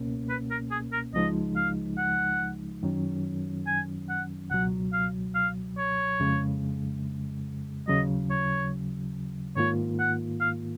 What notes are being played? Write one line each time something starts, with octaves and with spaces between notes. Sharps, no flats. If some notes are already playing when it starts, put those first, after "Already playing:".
Already playing: C#2 B2 A#3 C#4
B4
A#4
G#4
A#4
C#2 C#3 F3 G#3 D#4 D#5
F5
F#5
F#2 D#3 F#3 C#4
G#5
F#5
C#2 B2 F#3 F#5
F5
F5
C#5
F2 C#3 G#3
D#2 C#3 F#3 D#5
C#5
G#2 D#3 A#3 F4 C#5
F#5
F5